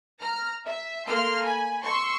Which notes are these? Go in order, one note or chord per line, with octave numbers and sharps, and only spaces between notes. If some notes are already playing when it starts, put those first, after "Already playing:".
A#5 F6
E5
A3 A#3 C6 F6
G#5 B5
C6 C#6 E6